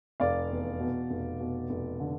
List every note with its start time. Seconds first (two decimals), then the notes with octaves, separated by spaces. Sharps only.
0.20 F1 D5 F5
0.50 E2
0.80 B2
1.10 F1
1.40 B2
1.70 F1
2.00 D3